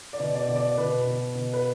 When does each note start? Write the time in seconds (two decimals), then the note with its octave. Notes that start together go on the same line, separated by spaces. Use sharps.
0.13 D5
0.20 B2
0.35 D5
0.49 B2
0.56 D5
0.78 B2 B4
1.07 B2
1.35 B2
1.53 B4